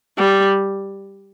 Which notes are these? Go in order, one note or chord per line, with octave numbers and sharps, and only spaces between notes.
G3